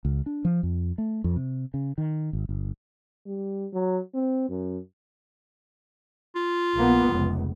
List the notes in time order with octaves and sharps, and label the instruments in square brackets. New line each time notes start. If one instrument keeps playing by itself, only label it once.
[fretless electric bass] C#2
D4
F3
F2
A3
F2
C3
C#3
D#3
G#1
G1
[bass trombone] G3
F#3
C4
F#2
[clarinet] F4
[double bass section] A#1 A#3 B3
F1 C#2